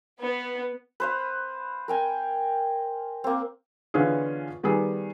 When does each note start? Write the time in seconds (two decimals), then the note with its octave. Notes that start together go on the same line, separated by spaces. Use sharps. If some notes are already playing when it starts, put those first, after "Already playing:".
0.22 B3
1.00 B4 C5 F5
1.88 A#4 G5 G#5
3.24 A#3 C4
3.94 D3 E3 B3 C#4 F4 G#4
4.63 D#3 G3 B3 G#4